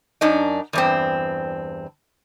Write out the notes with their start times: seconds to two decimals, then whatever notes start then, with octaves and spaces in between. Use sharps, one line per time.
0.21 F#2 D4 D#4
0.73 E2 G2 C4